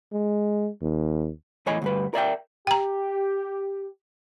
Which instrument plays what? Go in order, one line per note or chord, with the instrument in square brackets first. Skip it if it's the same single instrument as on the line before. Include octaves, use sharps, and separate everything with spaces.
[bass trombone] G#3
D#2
[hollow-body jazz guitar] E2 A2 C#5 D#5 G#5 B5
D2 G2 B4
A#4 D5 E5 G5
[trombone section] G4 [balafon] G5 A#5